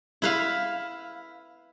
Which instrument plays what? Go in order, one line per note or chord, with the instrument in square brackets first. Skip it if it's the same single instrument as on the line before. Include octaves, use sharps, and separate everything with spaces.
[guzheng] E4 B4 F5